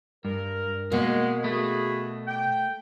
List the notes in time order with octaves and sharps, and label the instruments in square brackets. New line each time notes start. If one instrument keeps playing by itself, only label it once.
[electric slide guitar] G2 [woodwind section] A#4
[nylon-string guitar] B2 A#3 [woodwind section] G#3 [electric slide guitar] A#4 F#5
[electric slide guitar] A3 [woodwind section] F#4 G#4 B5
[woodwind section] G5